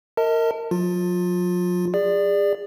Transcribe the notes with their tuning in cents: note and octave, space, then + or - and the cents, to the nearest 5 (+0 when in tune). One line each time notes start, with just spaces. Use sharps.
A#4 -20 D#5 +35 A5 +30
F#3 -45 F4 +20
G#4 -30 D5 +10